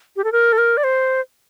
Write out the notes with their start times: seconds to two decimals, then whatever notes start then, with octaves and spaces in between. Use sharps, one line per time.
0.16 G4
0.24 A4
0.32 A#4
0.53 A4
0.58 A#4
0.77 D5
0.84 C5